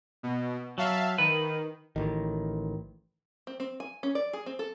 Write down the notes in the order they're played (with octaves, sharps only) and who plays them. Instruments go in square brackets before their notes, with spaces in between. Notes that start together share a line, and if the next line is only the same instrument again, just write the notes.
[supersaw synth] B2
[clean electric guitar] F#3 [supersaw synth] E5 F5 A5
[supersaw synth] D#3 [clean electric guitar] B4
[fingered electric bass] A1 D#3
[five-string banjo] C4
C4
G#5
C#4
D5
G#4
C4
A4